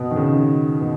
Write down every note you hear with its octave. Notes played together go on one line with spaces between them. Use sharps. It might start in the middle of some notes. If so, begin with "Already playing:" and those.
Already playing: B2
D#3
C#3
B2